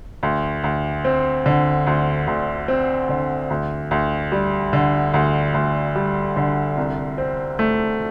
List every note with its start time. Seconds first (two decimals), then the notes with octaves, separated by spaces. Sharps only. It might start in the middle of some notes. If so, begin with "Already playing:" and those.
0.23 D2
0.64 D2
1.05 C4
1.46 D3
1.87 D2
2.27 D2
2.68 C4
3.09 D3
3.50 D2
3.91 D2
4.32 G3
4.73 D3
5.14 D2
5.54 D2
5.96 G3
6.37 D3
6.77 C2
7.18 C4
7.59 A3